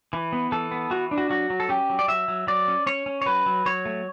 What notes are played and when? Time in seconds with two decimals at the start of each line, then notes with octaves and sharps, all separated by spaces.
0.13 E3
0.33 B3
0.52 E3 A4
0.71 B3
0.91 E3 F#4
1.11 D4
1.18 F#4
1.30 F#3 F#4
1.50 F#3
1.60 A4
1.69 C#4 G4
1.90 F#3
1.99 D5
2.08 F#3 E5
2.28 F#3
2.47 F#3 D5
2.68 C#4
2.86 C#4 C#5
3.06 C#4
3.22 C#5
3.26 F#3 B4
3.46 F#3
3.66 F#3 C#5
3.85 A3